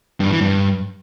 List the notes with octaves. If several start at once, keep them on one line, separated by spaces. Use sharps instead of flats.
G2
E3
G2